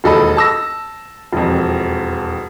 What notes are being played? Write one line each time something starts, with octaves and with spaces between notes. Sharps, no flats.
E1 D#2 A4 D#5 B5
A5 E6 A#6
E1 F2